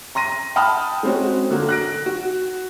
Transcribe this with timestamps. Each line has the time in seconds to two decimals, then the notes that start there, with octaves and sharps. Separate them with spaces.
0.15 A#5 C6 A#6 D#7
0.56 F#5 G5 A5 B5 D#6 F6
1.03 G#3 C4 C#4 F#4
1.50 D3 A#3 F#4
1.69 F#6 A#6 D7
2.06 F#4